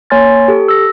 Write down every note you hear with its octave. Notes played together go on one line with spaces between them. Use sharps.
A#3 C#5 G#5 C6 F6 A6
G4 A4
E6 A#6